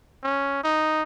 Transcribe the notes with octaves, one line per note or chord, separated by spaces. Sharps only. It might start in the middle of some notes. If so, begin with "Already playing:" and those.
C#4
D#4